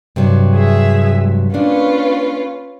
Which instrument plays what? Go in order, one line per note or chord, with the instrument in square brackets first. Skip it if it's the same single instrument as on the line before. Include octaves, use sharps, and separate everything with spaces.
[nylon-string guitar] G2 C3 F#3
[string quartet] G#4 E5
G#3
[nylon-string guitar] A#3 D4 [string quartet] C#4 F4 B4